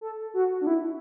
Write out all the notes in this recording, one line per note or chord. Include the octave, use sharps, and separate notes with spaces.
A4
F#4
D4
E4